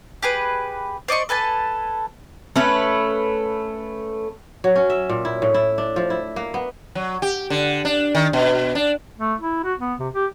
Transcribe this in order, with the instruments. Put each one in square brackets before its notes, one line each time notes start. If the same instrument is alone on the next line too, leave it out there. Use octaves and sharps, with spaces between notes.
[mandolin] G4 G#4 B4
C5 D5 D#5 C#6
A4 B4 G#5 A5
[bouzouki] A3 C#4 B4
[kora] F#3
C#4
E5
A#2
E4
A2
E4
D4
F3
E4
A#3
B3
[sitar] F#3
G4
D3
D4
D#3
B2
D4
[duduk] A3
E4
F#4
B3
C3
G4